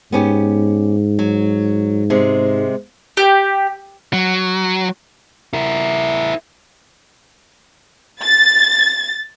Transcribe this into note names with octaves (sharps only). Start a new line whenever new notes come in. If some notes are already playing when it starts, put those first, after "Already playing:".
G#2 B3 C#4 G4
F#3
C3 G#3
G4
F#3
E4 A#4
A6